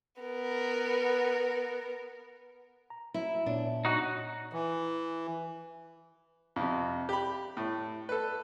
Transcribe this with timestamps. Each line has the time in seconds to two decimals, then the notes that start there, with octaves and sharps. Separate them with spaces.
0.22 B3 A#4
2.90 A#5
3.14 F#3 E4
3.46 A#2 B3 D4 F4 C#5
3.85 D#4 F#4
4.53 E3
6.56 F2 C3
7.09 G4 B5
7.57 A2
8.09 A4 B4